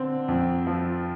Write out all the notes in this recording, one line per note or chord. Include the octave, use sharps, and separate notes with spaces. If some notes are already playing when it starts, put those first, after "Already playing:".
Already playing: D3 C4
F2
F3